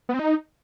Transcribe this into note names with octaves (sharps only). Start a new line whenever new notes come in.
B3
C4
D#4